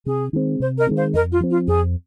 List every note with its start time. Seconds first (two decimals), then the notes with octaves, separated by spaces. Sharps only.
0.06 C3 G#4
0.33 D#3 G#3 C4
0.60 C3 C5
0.78 A#4 D#5
0.87 D#3 G#3 C4
0.96 C5 F5
1.13 F2 A#4 D#5
1.32 F4
1.40 F3 C4
1.50 F4
1.67 F2 G#4